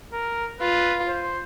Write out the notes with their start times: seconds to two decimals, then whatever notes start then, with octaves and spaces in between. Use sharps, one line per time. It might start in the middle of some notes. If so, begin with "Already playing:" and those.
0.13 A#4
0.60 F4 B4
1.08 C5